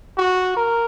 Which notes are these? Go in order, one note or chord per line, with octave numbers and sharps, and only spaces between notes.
F#4
A#4